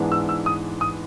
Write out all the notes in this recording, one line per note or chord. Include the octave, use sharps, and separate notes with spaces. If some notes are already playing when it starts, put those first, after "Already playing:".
Already playing: G#2 E3 G#3 B3 D4
E6
E6
D#6
D#6